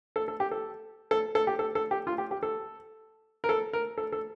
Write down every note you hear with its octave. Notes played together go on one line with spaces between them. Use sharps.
A4
A4
G4
A4
A4
A4
G4
A4
A4
G4
F4
G4
G4
A4
A#4
A4
A#4
A4
A4